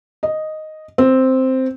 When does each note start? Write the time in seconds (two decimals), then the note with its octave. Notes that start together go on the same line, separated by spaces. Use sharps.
0.23 D#5
0.98 C4